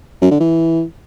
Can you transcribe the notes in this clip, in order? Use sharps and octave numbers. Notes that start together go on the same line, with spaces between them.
F#2
D3
E3